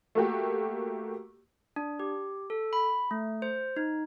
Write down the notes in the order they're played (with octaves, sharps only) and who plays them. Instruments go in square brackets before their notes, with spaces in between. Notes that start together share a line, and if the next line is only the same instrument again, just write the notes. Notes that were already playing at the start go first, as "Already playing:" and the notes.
[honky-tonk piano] A3 A#3 F#4 G4
[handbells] D4
G4
A4
B5
A3
C5
D#4